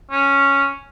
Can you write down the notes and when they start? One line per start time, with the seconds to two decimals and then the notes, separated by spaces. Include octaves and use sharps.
0.11 C#4